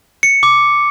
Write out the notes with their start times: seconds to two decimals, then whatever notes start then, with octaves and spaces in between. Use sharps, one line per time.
0.23 C#7
0.43 D6